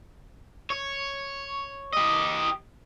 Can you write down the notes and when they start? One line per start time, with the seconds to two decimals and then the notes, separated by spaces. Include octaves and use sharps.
0.70 C#5
1.93 G4 D#5